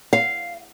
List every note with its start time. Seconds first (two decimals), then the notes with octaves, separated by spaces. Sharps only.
0.13 F5